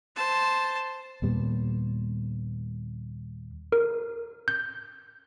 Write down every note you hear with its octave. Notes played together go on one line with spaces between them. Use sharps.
C5 A5
D#2 A#2 G3 B3
A#4
G6